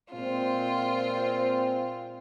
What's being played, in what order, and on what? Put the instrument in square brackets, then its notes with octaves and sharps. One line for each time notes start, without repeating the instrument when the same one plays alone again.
[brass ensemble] A#2 G#3 C4 [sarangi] F4